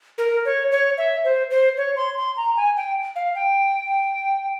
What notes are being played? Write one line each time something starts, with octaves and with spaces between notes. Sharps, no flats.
A#4
C#5
C#5
E5
C5
C5
C#5
C6
C6
A#5
G#5
G5
F5
G5